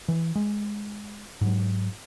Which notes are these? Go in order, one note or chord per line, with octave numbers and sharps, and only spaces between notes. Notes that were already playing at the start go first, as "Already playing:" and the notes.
E3
G#3
G#2 F#3